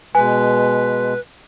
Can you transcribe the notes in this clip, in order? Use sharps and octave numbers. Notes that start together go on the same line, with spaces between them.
B2 G#3 B4 G#5